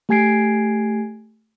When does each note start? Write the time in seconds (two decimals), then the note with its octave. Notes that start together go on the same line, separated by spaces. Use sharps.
0.09 A3 G4 G#5 G#6 C7 D7